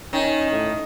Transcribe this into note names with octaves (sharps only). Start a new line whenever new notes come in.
D#3 C#4
A2